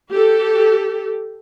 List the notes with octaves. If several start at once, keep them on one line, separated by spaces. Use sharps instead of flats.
G4 A4